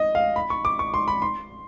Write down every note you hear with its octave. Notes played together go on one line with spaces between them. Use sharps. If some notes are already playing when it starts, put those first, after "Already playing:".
Already playing: D#5
F5
B5
C#6
D6
C#6
C6
B5
C6